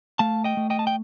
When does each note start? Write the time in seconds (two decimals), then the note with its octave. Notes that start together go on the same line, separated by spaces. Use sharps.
0.19 A3 F5 A5
0.44 D#5 G5
0.57 A3
0.70 D#5 G5
0.79 A5
0.87 G5